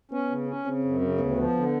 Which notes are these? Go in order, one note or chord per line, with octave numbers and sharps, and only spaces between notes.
B3 C#4
C#3
C#4
C#3 C4
F#2
C#3
D2 B3
F3
D3